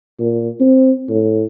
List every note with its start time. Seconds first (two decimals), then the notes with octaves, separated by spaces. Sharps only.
0.19 A#2
0.60 C4
1.09 A2